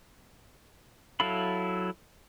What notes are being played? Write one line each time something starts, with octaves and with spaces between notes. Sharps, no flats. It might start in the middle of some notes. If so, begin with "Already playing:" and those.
F#3 E4 A4 F5 B5